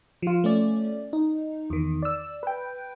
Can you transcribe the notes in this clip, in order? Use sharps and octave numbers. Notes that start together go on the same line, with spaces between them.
F3 F4
A3 C#4 D5
D#4
E2 D#3
D5 E6
B4 G5